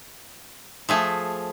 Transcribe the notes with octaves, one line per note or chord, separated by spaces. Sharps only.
F3 A3 G#4